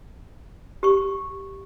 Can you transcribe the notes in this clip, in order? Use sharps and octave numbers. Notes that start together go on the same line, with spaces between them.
G4 C#6